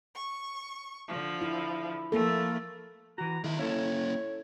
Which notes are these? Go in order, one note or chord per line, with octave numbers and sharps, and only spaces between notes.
C#6
D3 F3
E4
F3 A3 A#3 A4
E3 F#4 A#5
D#3 E4 G#4 E5
A#3 C#4 E4 A4 C#5